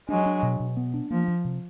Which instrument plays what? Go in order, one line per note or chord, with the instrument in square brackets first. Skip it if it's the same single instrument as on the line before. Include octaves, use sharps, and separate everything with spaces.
[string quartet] F#3 G#3 [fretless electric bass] D4
[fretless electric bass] D4
B2
B2
B3
D4
[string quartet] F3 [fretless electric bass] A#3
[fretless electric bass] F3
C3